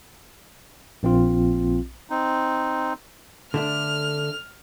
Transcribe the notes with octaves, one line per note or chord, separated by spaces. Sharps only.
A#1 C4 F4
C4 D#4
D3 A3 D4 F6